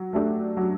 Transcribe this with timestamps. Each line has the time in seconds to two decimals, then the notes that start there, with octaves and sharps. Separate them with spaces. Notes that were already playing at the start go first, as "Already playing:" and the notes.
Already playing: F#3
0.13 A3 D4 G4
0.57 F#3